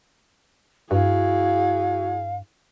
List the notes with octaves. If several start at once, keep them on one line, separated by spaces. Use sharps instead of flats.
G2 E4 F#4 G#4 F5